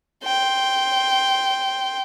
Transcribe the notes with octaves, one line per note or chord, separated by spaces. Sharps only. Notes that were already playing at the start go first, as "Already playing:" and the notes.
G5 C6